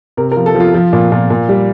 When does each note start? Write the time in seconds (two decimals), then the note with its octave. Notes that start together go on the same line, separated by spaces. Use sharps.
0.17 C3 A#4
0.32 A#4
0.37 F3
0.46 A4
0.55 F3
0.60 F4
0.74 F3
0.93 A#2
1.12 A#2
1.30 A#2
1.49 G3